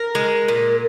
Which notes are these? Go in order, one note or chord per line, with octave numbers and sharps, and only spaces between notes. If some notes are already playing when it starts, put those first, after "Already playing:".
Already playing: A#4
G#3
A#2